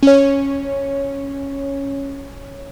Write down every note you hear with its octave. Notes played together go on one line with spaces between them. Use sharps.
C#4 C#5